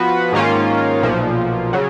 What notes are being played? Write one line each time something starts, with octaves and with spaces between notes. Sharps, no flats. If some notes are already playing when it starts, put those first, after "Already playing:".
Already playing: F3 B3 F#4 B4
G#2 D#3 A#3 C#4 F4
B1 A#2 F3
C#3 F#3